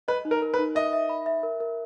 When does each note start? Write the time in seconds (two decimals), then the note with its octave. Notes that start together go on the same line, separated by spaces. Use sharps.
0.08 B4 D#5
0.25 D#4
0.31 A#4
0.42 A#4
0.54 B4
0.59 D#4
0.75 D#5 E5
0.93 E5
1.09 B5
1.26 E5
1.43 A#4
1.60 A#4